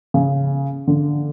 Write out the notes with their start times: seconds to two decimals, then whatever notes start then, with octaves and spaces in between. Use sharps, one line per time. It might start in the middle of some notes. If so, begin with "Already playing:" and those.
0.14 C#3
0.88 D3